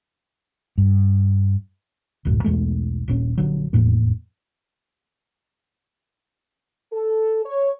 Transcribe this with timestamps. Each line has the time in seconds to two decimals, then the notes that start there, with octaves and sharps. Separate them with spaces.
0.78 G2
2.25 E1 C#2 F#2 A2
2.44 B1 E2 G#3 A3
3.08 D#1 A#1 C#4
3.38 A#1 D3 F#3
3.73 F1 E2 A2 A#3
6.93 A4
7.45 C#5